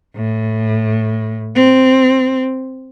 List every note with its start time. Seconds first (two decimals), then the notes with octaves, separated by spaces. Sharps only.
0.16 A2
1.55 C4